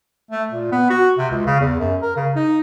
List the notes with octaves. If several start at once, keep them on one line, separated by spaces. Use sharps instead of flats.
A3
A#2
B3
F#4
C3
C#2
C#3
E2
F#2
A#4
C#3
D#4